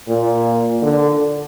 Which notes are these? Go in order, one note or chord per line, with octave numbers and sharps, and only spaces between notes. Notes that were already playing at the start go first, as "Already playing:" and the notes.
A#2
D3